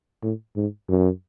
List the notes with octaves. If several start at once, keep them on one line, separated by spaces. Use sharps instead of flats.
A2
G#2
F#2